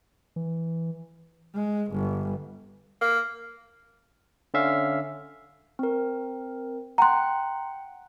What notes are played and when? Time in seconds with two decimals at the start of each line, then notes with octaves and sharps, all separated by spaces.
0.36 E3
1.54 G#3
1.92 G1
3.01 A#3
4.54 D3 C#4 E5 F5
5.79 C4 A#4
6.98 F#5 G5 A#5 C6 F#6